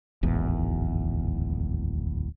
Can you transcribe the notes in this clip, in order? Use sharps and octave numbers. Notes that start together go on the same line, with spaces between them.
D1 G#1 E2